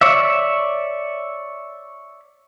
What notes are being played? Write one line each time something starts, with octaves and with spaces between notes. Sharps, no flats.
C#5 D5 E5